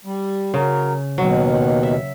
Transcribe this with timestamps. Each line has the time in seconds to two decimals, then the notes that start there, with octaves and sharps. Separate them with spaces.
0.05 G3
0.54 C#3 F#3 A#4
1.18 D#2 B2 D#3 F#3
1.83 E5